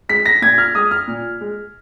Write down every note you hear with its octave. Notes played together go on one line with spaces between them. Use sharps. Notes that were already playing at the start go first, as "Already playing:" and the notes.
G#3 B6
A#6
A#2 G#6
F6
G#3 D#6
F6
A#2
G#3